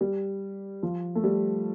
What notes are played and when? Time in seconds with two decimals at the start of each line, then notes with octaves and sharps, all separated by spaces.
0.01 G3
0.83 F3
1.15 A3
1.24 G3